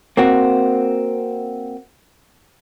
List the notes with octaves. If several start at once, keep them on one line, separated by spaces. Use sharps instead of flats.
A#3 C4 F#4